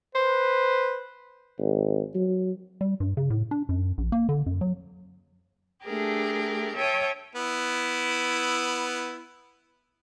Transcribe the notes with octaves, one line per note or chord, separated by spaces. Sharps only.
B4 C5
G#1
F#3
G3
G2
C#3
A2
D4
F#2
A#1
A#3
D3
F#2
F#3
A3 D4 G4 G#4 A#4
C#5 E5 G5 A5 D#6
B3 E4